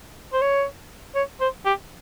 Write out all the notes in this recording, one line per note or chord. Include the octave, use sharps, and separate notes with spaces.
C5
C#5
C#5
C5
G4